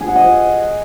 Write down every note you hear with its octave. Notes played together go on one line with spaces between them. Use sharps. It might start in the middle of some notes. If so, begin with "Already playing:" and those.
G#4
F#5
D#5